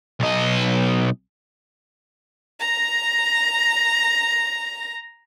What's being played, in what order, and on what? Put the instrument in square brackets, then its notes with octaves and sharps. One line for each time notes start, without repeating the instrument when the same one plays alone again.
[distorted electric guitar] B1 D#5
[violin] A#5 A#6